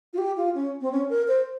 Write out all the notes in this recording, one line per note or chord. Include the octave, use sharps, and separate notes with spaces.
F4
G4
F4
C#4
C4
C#4
A#4
C5